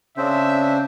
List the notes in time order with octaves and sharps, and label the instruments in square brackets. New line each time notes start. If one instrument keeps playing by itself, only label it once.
[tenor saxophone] C#3 [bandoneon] C4 D4 C5 [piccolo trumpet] E5